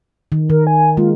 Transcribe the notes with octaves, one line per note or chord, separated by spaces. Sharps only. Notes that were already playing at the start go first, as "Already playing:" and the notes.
D#3
D#3 A#4
G#5
G#3 A#3 F4